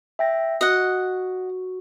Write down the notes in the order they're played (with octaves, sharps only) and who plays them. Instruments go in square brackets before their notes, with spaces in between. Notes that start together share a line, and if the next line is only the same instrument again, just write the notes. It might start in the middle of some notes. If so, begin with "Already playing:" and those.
[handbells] E5 G5 A#6
[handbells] F#4 [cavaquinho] D#5 F#5